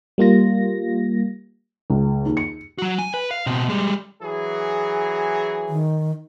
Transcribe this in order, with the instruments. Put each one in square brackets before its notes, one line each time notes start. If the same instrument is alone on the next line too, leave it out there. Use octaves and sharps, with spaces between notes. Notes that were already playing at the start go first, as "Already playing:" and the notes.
[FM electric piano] G3 A#3 F4 A#6
[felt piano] C#2
D#2
C#7
[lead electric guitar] F#3 F#4
G#5
B4
F5
B2 C4
G3 G#3
[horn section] E3 F#3 G#4
[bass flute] D#3